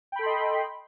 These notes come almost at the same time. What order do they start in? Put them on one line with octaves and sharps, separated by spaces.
G5 B5 A4 C6 D#5